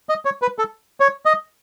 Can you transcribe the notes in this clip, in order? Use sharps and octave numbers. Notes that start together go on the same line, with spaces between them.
D#5
C#5
B4
A4
C#5
D#5